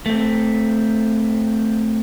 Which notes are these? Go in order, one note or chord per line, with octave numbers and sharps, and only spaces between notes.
A3 C4